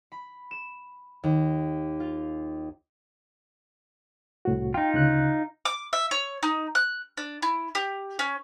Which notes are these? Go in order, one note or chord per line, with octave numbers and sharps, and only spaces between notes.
B5
E7
D#2
F4
C2 A2 F#4
D#4 F4 G5
D2 C#3 F#6
D6
E5
C#5
D#4
F#6
D4
E4
G4
C#4